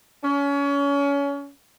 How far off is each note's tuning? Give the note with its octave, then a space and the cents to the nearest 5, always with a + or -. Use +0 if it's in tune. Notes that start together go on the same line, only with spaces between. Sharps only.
C#4 +30